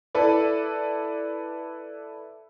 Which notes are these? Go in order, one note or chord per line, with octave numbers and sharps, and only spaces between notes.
E4 A4 B4 D5